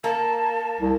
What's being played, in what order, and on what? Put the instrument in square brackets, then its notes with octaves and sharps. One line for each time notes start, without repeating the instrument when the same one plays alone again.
[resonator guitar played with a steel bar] A#3 [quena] A5
[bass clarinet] C2